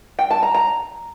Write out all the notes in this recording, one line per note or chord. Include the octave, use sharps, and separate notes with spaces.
G5
A5
A#5
A#5